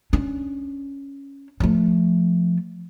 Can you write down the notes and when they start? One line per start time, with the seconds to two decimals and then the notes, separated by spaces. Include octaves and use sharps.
0.13 C#4 D4
1.60 F3 A3